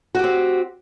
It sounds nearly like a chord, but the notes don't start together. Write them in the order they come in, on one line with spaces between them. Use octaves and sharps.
F#4 G4 C4